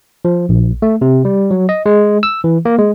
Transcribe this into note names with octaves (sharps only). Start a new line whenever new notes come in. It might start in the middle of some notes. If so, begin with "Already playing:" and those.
F3
A#1
A3
C3
G3
F#3
D#5
G#3
E6
E3
A#3
G#3